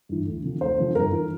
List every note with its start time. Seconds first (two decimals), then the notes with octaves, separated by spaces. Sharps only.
0.09 G2 E3
0.26 D2
0.44 C3 F3
0.61 D2 C5
0.78 C3 F3
0.95 G1 A#4
1.12 E3